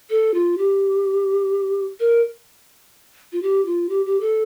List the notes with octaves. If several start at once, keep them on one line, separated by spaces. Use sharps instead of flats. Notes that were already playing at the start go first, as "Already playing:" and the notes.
A4
F4
G4
A#4
F4
G4
F4
G4
G4
A4